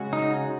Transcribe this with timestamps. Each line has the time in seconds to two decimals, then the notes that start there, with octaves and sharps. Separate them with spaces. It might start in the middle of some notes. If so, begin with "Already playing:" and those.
Already playing: C#3 G#3 C#4 F#4
0.13 D#4
0.44 G#3